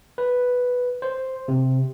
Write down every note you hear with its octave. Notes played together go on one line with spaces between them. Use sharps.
B4
C5
C3